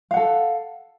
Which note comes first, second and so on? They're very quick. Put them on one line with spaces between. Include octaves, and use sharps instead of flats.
F5 F#5 A4